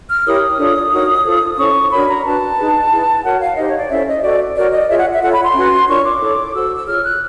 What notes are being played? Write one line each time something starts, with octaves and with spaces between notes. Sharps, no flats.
F6
E4 G4 A#4 C#5 D#6
D4 F4 A4 C#5
D#4 F#4 A#4 C#5
F4 A4 C5
C#4 E4 A4 C5 C#6
D4 F#4 A#4 C#5 B5
A#5
D4 F#4 B4 A5
D#4 G#4 B4
E4 G#4 B4
F#4 A#4 C#5 F#5
F5
D#4 G4 C5 D#5
C#5
D5
C#4 E4 A4 C5 E5
D#5
F#4 A4 C5 D5
F#4 A#4 C#5 D5
D#5
F4 G#4 C#5 E5
F#5
E5
F4 A4 C#5 F#5
B5
C6
C#4 F#4 B4
D4 F4 A#4 C#5 C#6
D6
E4 A4 C#5
F#4 A4 C5 E6
E6
F4 G#4 C#5 F6
F#6